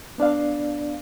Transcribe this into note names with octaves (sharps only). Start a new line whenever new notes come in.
B3 D4 D5 F5